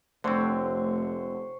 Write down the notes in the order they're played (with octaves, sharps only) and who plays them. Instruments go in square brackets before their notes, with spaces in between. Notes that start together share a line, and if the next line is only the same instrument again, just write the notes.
[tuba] F1 [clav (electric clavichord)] D3 C4 [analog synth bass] A3 [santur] C5 C#5